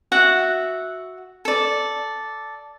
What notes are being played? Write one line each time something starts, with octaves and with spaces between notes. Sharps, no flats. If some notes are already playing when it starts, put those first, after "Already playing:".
F#4 E5 F#5
A4 D5